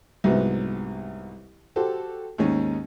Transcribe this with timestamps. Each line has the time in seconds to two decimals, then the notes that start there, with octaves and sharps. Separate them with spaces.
0.24 C2 G#2 C3 F#3 B3
1.76 F#4 G4 A4 C5
2.38 D#2 G#2 D#3 C#4